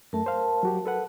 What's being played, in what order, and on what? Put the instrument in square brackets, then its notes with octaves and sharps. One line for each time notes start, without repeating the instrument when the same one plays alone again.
[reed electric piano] F#2 A3 [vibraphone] A#4 A5
[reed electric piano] C5 F5
F#3 F#4 G4
A4 B4 F#5